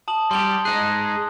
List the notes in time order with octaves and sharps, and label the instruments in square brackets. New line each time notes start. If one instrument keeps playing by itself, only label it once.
[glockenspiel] A5 D#6 F#7
[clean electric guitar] G3 G4 [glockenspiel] C6 G7
[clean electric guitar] G#3 D#4 G#4 [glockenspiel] F#6